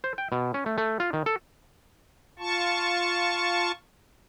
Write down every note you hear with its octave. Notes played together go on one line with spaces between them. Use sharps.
C5
G5
B2
C#4
A3
A3
F4
D#3
A4
F4 A5 C#6